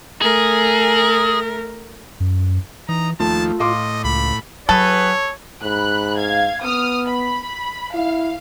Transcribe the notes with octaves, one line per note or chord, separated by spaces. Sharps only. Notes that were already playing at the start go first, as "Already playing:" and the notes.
A3 G#4 A#4
F#2
E3 D#4 A#5
D#2 F3 A3 F4 A5
A2 D#5 F5 C6 D6
C#2 B5
F#3 F#4 G#4 A4 B4 C#5
G#2 B5 F#6
F5 G#6
B3 D#6 F6
B5
E4 F5